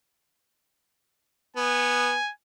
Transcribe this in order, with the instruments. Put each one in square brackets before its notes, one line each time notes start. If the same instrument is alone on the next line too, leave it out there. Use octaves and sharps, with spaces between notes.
[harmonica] B3 [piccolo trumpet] G#5